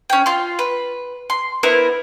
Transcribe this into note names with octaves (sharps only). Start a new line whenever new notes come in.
C#4 G5
F4 C6
B4
C6
B3 E4 A#4 C5